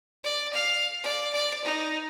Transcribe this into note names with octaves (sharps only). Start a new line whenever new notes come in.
D5
F5
D5
D5
D#4